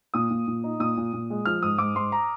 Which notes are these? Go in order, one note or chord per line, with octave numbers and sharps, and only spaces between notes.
A#2 D#6
A#2
A#2
D#4
A#2 D#6
A#2
A#2
G#3
F3 F6
G#2 D#6
G#2 D6
G#2 C6
A#5